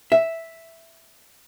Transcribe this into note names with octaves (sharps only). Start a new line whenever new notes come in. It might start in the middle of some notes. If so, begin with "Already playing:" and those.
E5